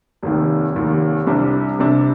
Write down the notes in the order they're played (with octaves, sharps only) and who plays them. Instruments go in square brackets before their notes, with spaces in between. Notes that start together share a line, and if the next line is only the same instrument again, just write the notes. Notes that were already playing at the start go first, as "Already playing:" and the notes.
[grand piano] F1 D#2 D#3
F1 D#2 D#3
C2 C3 G3 D4
C2 C3 G3 D4